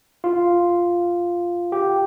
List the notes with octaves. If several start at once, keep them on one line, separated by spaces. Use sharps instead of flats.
F4
G4